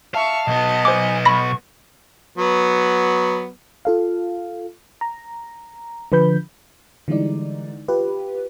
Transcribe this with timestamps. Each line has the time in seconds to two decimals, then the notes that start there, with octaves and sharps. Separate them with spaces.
0.15 E5 F5 A5 C#6
0.48 B1 B3 D#5
0.85 C5 G#5 D6
1.25 B5 C#6 A#6
2.38 F#3 B3
3.85 F4 A4 F5
5.01 A#5
6.12 D3 F3 B4 B5 G6
7.08 D3 E3 G3 G#3 D#4 D5
7.88 F4 G4 B4